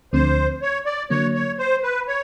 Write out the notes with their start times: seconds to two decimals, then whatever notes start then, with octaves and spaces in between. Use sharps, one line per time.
0.13 D2 D3 F3 A3 C4 C5
0.62 C#5
0.86 D5
1.10 D3 F#3 A#3 C#5
1.35 C#5
1.59 C5
1.83 B4
2.08 C#5